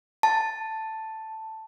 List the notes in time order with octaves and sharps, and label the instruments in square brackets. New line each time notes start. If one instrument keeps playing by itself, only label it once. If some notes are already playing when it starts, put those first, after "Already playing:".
[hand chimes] A5